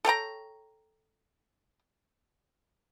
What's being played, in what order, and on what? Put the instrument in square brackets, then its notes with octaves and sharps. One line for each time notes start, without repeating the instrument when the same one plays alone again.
[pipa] A4 C#5 G5 A#5